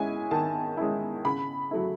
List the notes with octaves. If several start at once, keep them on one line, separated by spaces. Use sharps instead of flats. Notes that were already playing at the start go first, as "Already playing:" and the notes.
Already playing: G#3 C#4 E4 G#5
D#3 A5
G#3 C#4 E4
C#3 B5
F#3 A3 E4